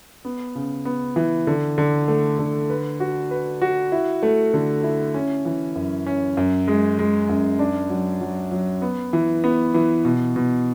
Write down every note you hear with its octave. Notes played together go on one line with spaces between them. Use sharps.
B3
C#3
B3
E3
D3
D3
A3
D3
B4
F#4
B4
F#4
E4
A3
D3
E4
C#4
E3
F#2
C#4
F#2
G#3
G#3
F#2
D4
F#3
F#3
F#3
B3
E3
B3
E3
B2
B2